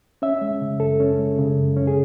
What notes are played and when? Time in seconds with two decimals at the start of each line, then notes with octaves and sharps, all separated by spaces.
0.22 C#4 E5
0.41 G#3
0.61 C#3
0.80 F#2 A4
1.00 C#4
1.18 G#3
1.39 C#3
1.58 F#2
1.76 C#4
1.87 G#4